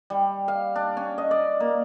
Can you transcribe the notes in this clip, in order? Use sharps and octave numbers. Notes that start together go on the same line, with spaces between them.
G3
F5
D4
C#4
D#5
D5
A#3